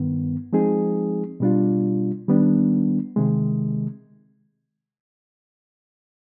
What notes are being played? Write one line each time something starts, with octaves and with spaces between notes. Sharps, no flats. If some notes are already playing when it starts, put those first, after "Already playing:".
Already playing: G2 D#3 B3
F3 G#3 C4 D#4 G#4
B2 G3 D4 F4
D#3 G3 B3 D4
C3 D#3 G#3